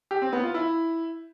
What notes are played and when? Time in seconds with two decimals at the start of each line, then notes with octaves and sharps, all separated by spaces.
0.11 G4
0.22 C4
0.33 B3
0.43 F4
0.54 E4